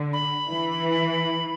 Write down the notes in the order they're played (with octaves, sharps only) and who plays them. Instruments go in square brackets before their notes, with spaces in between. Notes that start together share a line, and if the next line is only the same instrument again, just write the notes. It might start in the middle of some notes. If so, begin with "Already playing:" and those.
Already playing: [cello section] D3
[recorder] B5
[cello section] E3